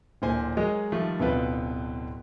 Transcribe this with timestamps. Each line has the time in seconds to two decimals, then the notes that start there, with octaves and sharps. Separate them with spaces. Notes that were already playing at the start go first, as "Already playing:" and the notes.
0.22 D1 A#2 C5 G#5
0.57 F#3 G#3 G#4 A#4 D#5
0.92 D#3 F3 G3 A3
1.20 D1 B2 B3 C4 F4 B4